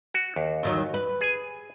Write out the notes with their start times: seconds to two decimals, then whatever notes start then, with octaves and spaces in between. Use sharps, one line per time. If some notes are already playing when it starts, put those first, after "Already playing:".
0.14 F#4
0.36 D#2
0.63 E2 D#3 F#3
0.94 B4
1.21 G#4 G#5